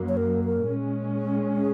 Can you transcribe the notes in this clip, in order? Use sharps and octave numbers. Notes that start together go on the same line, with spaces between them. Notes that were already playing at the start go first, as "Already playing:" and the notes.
Already playing: F#2 F#3 A#3
C#5
A#4
A#4
A#2 G#3 C#4
G#4